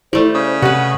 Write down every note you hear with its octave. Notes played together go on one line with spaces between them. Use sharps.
G3 A3 E4 C5
C#3
C3 F#4 B4 F#5